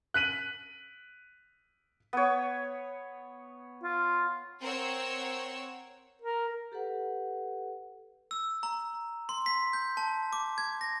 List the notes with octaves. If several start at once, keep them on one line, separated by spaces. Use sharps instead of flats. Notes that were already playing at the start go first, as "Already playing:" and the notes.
F#6 B6 D#7 F#7
B3 C#5
F4
C4 A#4 C5 C#5 F#5 E6
A#4
G4 A4 B4 F#5
E6
A#5
C6
B6
G6
A5
D6
G#6
A#6